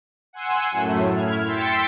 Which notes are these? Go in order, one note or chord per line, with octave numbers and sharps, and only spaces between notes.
F#5 G#5 C6 E6
F#2 A2 A3
E4 F6 G#6
G5 C6 E6 A6 B6 C#7